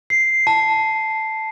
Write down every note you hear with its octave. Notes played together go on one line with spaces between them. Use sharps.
C7
A5